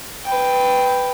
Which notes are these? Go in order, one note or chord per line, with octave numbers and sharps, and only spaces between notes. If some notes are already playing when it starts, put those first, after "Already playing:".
B4 G5